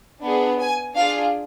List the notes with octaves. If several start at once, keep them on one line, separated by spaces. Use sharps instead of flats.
B3 D4 G#4
G#5
D4 F4 G#4 F5